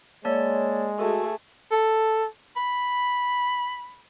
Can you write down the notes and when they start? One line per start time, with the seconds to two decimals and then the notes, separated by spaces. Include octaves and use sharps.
0.25 G#3 A#3 C#5 D5 A5
0.99 A3 F#4 G#4 A4
1.71 A4
2.57 B5